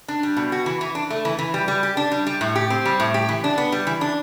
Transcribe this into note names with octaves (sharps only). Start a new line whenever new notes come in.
D4
G3
B2
F#4
E3
E3
D4
A3
E3
E3
G3
G3
G4
D4
G3
G3
A2
G4
C4
G3
A2
G4
E3
D4
B3
G3
E3
D4